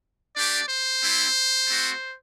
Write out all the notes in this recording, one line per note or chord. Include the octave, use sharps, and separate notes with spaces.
A3 D4 G4 D5
C5
G3 C4 E4
A3 C4 F#4